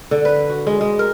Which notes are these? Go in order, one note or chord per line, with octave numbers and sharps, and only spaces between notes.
D3
B4
F#4
G#3
G#3
A#4